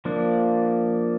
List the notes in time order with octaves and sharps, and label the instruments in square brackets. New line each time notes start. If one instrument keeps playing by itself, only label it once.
[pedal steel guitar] F3 A#3 D4